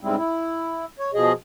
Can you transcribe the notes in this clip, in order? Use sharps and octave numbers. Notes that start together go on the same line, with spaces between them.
G#2 C#3 G3 G#3 C4 E4
E4
C#5
B2 F3 G#4 D#5